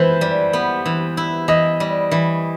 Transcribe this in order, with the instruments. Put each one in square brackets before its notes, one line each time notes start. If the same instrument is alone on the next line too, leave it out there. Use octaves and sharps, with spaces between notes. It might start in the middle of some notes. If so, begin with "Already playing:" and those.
Already playing: [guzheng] E3 E4 [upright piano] B4 C5
[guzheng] G3
B3
E3
E4
[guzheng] E3 [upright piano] D#5
[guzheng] G3
E3